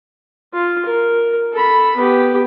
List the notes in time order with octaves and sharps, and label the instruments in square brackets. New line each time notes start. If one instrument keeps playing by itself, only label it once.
[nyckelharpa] F4
A#4
A4 B5
B3 G4